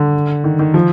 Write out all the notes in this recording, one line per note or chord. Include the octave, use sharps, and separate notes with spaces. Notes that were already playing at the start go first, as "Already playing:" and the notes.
Already playing: D3
D#3
D#3
F3